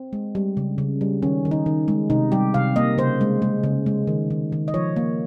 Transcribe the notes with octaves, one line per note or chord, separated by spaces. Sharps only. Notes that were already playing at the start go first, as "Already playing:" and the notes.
Already playing: C4
G#3
G3
C#3
C#3
G3
D#3 C#4
D#3
D#4
D#3
G#3
C3 D#4
G3 G4
C3 F5
A#3 D#5
C#3 C5
G#3
G#3
C#3
G#3
D#3
D#3
D#3
D#5
F3 C#5
A#3